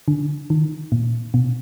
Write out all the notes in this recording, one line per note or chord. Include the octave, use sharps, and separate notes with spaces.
D3
D#3
A#2
B2